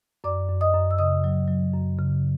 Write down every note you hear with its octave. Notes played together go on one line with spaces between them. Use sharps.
F#2 D5 D6
F#2
D#5 D#6
F#2
E6
C#3 D#5 D#6
F#3
F#3
F#2
C#3